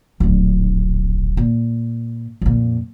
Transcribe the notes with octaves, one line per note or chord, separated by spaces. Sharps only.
D1 A#1
A#2
F2 A#2